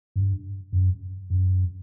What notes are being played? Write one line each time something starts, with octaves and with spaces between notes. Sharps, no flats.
G2
F#2
F#2